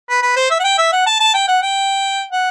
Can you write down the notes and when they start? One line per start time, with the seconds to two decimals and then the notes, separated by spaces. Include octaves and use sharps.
0.09 B4
0.22 B4
0.36 C5
0.51 E5
0.60 F#5
0.64 G5
0.78 E5
0.92 F#5
1.06 A5
1.20 A5
1.34 G5
1.48 F#5
1.62 G5
2.31 F#5